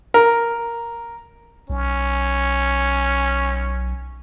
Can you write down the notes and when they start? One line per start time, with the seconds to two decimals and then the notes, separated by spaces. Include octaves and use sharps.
0.14 A#4
1.70 B1 C#4